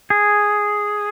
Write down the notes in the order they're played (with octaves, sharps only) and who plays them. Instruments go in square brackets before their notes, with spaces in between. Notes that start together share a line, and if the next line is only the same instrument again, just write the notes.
[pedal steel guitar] G#4